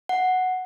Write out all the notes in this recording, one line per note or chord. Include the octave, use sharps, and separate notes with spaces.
F#5